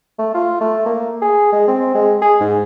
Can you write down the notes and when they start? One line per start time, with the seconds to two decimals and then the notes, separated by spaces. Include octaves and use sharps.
0.19 A3
0.35 F4
0.61 A3
0.86 A#3
1.22 G#4
1.52 G#3
1.68 C4
1.95 G#3
2.22 G#4
2.41 G#2